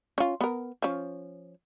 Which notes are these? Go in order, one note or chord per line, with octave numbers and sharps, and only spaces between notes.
C#4 F4
B3 A#4
F3 C#4